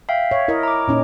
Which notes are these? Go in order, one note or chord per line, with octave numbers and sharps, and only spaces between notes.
E5 F5 G5
C#5 E5
E4 A#4 D#5
A#5 D6
A#2 C#4 D#4